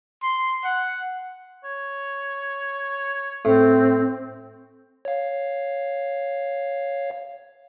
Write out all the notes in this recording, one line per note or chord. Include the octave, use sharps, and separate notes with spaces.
C6
F#5
C#5
A2 C4
C#5 F5